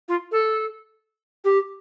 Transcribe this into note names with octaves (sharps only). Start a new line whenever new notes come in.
F4
A4
G4